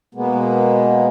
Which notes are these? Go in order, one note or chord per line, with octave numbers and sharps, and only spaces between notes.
B2 G#3 A#3 B3